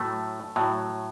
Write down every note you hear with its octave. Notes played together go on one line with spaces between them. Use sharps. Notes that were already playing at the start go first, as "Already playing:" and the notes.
Already playing: A2 F#3 A3
A2 F#3